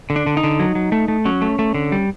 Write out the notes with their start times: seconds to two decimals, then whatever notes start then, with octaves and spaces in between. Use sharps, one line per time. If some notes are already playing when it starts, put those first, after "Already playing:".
0.10 D3
0.16 D4
0.26 D3
0.37 D#4
0.43 D3
0.60 F#3
0.75 F#3
0.92 A3
1.08 A3
1.25 F#3 C#4
1.42 A3
1.59 A3
1.74 D3
1.92 G3